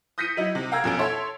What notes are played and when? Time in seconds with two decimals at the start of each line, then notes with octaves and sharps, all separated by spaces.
0.18 D#6 G6 A#6 B6 C#7 D#7
0.37 F#3 D#4 E4
0.55 C3
0.72 F5 G5 A#5 E6 G#6
0.84 F2 B2 C#4 D7
0.99 A4 C#5 E5 C6